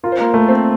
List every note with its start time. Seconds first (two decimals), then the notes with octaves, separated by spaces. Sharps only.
0.03 F4 A#4
0.12 C5
0.20 A#3 A#4
0.34 A3
0.48 C4 C5